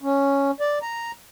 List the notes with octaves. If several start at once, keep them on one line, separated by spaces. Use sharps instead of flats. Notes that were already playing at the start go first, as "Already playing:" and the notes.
C#4
D5
A#5